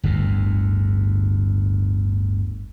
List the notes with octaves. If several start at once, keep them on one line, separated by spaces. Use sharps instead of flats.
G1 D2 A2